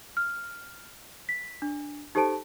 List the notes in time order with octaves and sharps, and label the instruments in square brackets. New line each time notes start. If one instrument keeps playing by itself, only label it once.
[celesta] F6
B6
D4
D#4 G4 A4 C5 A5 D7